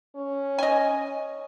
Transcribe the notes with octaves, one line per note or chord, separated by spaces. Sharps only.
C#4
D#5 G#5